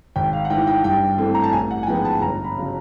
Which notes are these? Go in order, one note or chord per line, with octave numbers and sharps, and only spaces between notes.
G#1 G5
F5
F#5
G#2 E3 G5
G5
G2 G5
E3 A3 C4
A#5
A5
A1 G#5
F#5
G#5
G#2 F3 G#3 B3 G5
A5
G1 A#5
B5
C#3 F#3